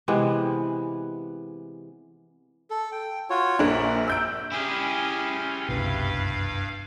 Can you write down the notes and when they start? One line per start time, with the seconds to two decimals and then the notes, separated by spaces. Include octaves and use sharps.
0.08 C3 E3 G#3 B3
2.70 A4
2.92 G5
3.30 F4 F#4 C#5
3.59 A#1 D4 A#4
4.08 E6 G6 D7
4.52 C#4 E4 G4 G#4
5.69 F#1 C2 G2 B2 B4 F5